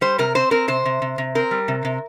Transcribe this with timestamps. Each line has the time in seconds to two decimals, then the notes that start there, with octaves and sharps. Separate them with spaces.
0.01 G3 C5
0.18 C3 A#4
0.35 C4 C5
0.51 C4 A#4
0.68 C3 C5
0.85 C3
1.02 C3
1.18 C3
1.35 C4 A#4
1.51 G3
1.68 C3
1.85 C3